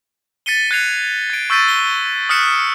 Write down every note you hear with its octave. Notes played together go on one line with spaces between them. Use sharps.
A6 B6 C#7 D#7 G7
F#6 G#6 C7 F7
G#6 D7
C#6 E6 G6 A6 B6 D#7
G7
D#6 F6 F#6 B6 C#7 E7